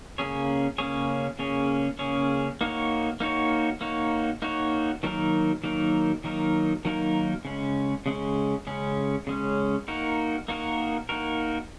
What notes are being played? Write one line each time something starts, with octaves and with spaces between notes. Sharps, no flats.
C#3 A#3 C#4 G#4 C#5
C#3 A#3 C#4 G#4 C#5
C#3 A#3 C#4 G#4 C#5
C#3 A#3 C#4 G#4 C#5
A#3 D#4 F#4 C#5
A#3 D#4 F#4 C#5
A#3 D#4 F#4 C#5
A#3 D#4 F#4 C#5
D#3 F#3 A#3 D#4 A#4
D#3 F#3 A#3 D#4 A#4
D#3 F#3 A#3 D#4 A#4
D#3 F#3 A#3 D#4 A#4
C#3 G#3 C#4
C#3 G#3 C#4
C#3 G#3 C#4
C#3 G#3 C#4
A#3 D#4 F#4 A#4
A#3 D#4 F#4 A#4
A#3 D#4 F#4 A#4